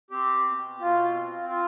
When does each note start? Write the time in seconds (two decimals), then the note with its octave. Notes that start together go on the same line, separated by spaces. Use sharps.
0.11 C4 G4
0.45 B2
0.80 B2 F4
1.14 C4
1.49 F4